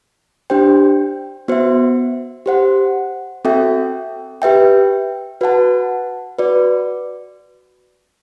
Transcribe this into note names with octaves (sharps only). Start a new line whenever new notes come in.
D4 G4 C5 G5
B3 F#4 C5 E5
G4 C5 F#5
C4 F#4 A4 E5 G5
G4 B4 E5 G5
F#4 B4 F#5 A5
F#4 B4 D5